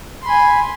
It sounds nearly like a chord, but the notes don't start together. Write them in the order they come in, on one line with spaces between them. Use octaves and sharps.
C6 B5 G#5